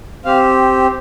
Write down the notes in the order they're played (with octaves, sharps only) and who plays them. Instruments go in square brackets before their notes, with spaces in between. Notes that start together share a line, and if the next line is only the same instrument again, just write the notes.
[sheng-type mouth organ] C4 G4 F5